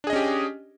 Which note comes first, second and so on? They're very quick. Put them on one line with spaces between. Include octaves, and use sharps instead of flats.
D4 G#4 D#5 C#4 G4